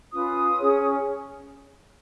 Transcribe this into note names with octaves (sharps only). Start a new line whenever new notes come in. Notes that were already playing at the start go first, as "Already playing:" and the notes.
C#4 F4 B4 D#6
C#4 G#4 C#5